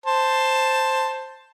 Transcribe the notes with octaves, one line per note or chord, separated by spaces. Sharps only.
C5 A5